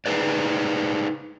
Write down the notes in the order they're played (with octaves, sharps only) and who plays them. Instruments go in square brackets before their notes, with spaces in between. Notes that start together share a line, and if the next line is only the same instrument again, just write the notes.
[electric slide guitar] D#4 G#4 B4 D5